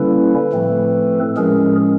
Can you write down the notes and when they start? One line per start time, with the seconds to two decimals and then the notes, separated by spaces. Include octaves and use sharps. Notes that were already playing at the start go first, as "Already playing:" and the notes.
Already playing: D3 G3 A#3 C#4 E4 A4 B4
0.52 A2 F3 A3 C4
1.37 A2 F3 G#3 C#4 G#4 A#4